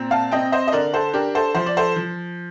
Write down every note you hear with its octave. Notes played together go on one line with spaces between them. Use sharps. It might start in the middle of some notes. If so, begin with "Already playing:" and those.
Already playing: A#2 C4
F5 A5
C4 D#5 G5
C5 D#5
D#5
D3 A#4 D5
A4 C5
D4 G4 A#4
A4 C5
F3 C5
D5
A4 C5
F3